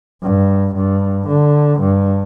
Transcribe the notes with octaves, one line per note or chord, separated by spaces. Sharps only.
G2
G2
D3
G2